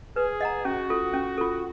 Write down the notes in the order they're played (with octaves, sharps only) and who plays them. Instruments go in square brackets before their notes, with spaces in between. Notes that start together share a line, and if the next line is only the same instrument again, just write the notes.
[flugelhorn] G#4 [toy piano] B4
[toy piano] D#5 F#5 A#5
[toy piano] C#4 [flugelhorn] F#4
[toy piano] F4 A4
C#4
F4 A4